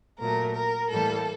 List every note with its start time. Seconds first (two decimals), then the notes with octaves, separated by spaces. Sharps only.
0.18 A#2 F#3 A3 A#4
0.54 A#4
0.90 A2 E3 G3 A#3 A4